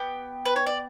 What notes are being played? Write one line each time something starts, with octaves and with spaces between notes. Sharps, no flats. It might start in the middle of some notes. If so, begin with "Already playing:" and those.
Already playing: B3 G4
B4
C#5
D5